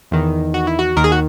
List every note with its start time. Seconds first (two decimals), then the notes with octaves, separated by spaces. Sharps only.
0.11 E2 D#3
0.54 F#4
0.67 E4
0.79 F#4
0.96 D#2 D#3 A#4
1.04 G#4
1.12 F#4